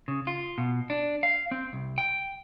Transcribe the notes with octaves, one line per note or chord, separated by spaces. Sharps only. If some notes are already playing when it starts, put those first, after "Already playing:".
C#3
F4
B2
D4
F5
C4
C2
G5